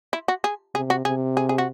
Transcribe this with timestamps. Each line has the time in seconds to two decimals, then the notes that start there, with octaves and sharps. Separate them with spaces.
0.13 E4
0.28 F#4
0.44 G#4
0.74 C3 G#4
0.90 F#4
1.05 C3 G#4
1.37 G#4
1.49 G#4
1.58 F#4